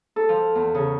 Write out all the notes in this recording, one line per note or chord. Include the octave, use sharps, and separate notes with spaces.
A4
F3
E2
C#3